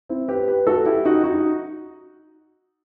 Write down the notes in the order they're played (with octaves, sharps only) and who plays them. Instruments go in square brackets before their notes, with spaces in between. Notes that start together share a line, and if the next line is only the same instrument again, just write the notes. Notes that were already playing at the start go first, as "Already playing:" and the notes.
[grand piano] C4 E4
G4 B4
G4 B4
F#4 A4
E4 G4
D#4 F#4
D#4 F#4